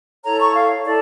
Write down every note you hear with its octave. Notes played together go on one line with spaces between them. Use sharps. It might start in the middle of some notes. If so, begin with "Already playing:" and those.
E4 A4 C#5 A#5
C#6
F5
E4 A4 D5